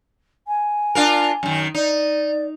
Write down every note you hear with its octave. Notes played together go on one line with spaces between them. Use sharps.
G#5
D4 F4 A#4
F#2 D#3
D#4 D5